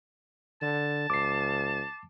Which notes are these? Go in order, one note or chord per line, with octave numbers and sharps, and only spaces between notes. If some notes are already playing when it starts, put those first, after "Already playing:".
D3 A5
C#2 D6 C7